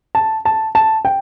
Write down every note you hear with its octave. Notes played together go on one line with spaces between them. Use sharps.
A5
A5
A5
G5